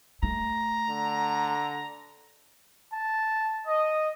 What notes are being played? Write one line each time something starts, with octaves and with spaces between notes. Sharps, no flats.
A3 A#5
D3
A5
D#5